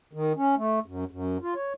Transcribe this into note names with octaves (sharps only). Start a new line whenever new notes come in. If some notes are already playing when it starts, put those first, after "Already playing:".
D#3
C#4
A3
F#2
F#2
F4
C#5